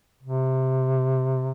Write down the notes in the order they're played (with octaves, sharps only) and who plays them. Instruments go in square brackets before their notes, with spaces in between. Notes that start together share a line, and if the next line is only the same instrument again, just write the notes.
[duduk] C3